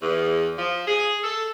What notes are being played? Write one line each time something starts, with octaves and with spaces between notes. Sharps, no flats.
E2
F3
G#4
A4